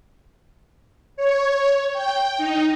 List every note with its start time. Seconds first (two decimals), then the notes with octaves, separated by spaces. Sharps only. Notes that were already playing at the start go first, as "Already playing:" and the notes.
1.17 C#5
1.93 G5
2.38 D#4